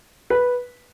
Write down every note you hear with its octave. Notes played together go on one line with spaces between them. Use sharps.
B4